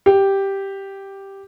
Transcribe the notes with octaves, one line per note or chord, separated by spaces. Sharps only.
G4